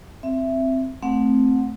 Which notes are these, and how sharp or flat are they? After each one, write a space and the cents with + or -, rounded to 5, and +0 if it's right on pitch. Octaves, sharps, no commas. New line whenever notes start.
C4 +0 E5 +10
A3 +0 C4 +0 F#5 -25